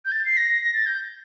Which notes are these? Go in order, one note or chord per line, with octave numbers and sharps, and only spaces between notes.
G6
A6
C7
A#6
A#6
A6
G6